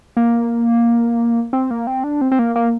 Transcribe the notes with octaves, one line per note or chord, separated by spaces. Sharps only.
A#3
C4
A#3
C4
D4
C4
C4
A#3
A#3